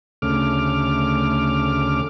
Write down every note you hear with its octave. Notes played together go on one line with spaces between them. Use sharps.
D2 C#3 A3 D6 F6